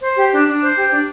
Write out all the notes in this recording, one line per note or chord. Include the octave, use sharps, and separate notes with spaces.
C5
G4
D4
D4
C5
G4
D4